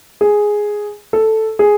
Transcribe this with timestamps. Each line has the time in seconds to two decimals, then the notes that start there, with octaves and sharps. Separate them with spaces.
0.21 G#4
1.13 A4
1.59 G#4